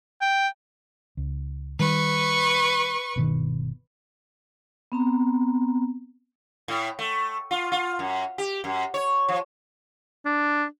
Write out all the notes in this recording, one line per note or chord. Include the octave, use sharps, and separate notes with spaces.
G5
C#2
D#3 G3 B4 C#6
G1 B2 D#3
B3 C4 A#5
A2
A3
F4
F4
F#2
G4
F#2
C#5
F3
D4